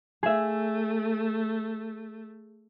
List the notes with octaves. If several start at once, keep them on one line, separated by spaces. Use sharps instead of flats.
A3 G#4 E5